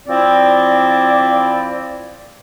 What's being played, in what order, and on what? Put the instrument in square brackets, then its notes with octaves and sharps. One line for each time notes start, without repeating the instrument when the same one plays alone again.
[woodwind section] F3 C4 E4 D5